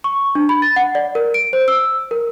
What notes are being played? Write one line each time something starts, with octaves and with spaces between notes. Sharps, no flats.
C#6
D4
B5
A6
F#5
D5
A#4
D7
C5
E6
A#4